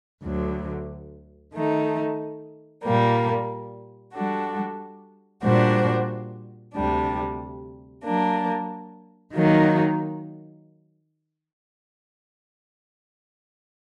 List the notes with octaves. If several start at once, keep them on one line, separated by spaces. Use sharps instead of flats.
D2 D3 F#3
D#3 A3 D#4
A#2 G3 A#3
G3 D4 F#4 A4
A#2 G3 D4 F#4 C5
D2 C3 G3 D4
F#3 A#3 D4
D#3 F#3 A#3 D#4